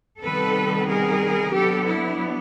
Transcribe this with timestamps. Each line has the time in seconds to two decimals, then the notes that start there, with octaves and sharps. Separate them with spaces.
0.21 C3 D#3 G3 B3 D#4 A4 B4
0.87 G#4 A#4
1.52 F#3 B3 D4 G4 A4
1.86 E4